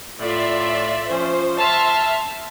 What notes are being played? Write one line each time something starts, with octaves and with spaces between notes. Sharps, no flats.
A2 F4 D5 E5
F3 C#4 C5
E5 A5 C6 F6